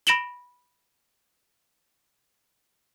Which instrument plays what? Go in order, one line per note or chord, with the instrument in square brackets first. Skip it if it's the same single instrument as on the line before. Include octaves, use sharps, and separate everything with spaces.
[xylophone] B5 A#6 D7 E7 F#7 G7